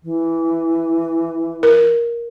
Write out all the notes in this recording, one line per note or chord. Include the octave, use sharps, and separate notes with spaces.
E3
A#4